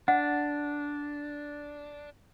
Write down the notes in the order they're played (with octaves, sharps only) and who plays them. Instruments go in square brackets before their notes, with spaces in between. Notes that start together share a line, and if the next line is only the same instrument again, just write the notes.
[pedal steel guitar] D4 [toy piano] F#5